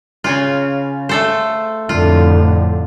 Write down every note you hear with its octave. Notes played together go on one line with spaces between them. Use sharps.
C#3 C#4 F4
A3 A4 C5
F2 A2 D3 F4